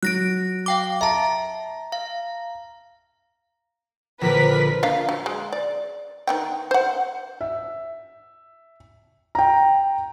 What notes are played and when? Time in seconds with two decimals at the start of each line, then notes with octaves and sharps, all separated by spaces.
0.03 F#3 F#6 A#6 D7
0.66 F5 G5 D6
1.01 E5 A5 A#5
1.92 F5
4.21 A#1 D3 A#4 B4 B6
4.83 A#3 D4 F5
5.09 F#3
5.26 G#3
5.52 D5
6.27 D#3 B3 G5
6.71 C5 F#5
7.41 E5
9.35 G5 A#5